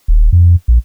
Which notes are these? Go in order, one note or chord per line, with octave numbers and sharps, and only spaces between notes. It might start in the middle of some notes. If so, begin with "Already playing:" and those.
D#1
F2
A#1